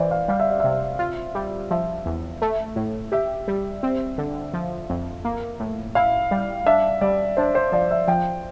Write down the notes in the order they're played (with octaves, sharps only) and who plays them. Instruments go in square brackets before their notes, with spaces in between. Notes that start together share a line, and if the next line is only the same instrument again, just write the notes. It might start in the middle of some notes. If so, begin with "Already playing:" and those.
Already playing: [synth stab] E3 [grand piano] C5 D5
[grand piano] F5
[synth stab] G3 [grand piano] F5
[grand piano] E5
D5
[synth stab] C3 [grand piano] E5
[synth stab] F4
G3
[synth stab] F3 [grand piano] E5
[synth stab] E2
A3
A2
[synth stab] G4 [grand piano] E5
[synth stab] G3
C4
D3
F3
F2
A#3
A2
[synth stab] E4 [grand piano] F5
[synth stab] G3
[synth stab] D4 [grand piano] E5
[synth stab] G3 [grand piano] D5
[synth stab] D4 [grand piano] C5
[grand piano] C5
[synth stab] F3 [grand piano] D5
[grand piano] E5
[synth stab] F3 [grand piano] G5